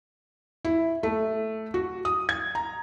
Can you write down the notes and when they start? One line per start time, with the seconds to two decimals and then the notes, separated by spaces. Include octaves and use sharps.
0.65 E4
1.03 A3
1.74 F#4
2.05 D#6
2.29 G#6
2.55 A#5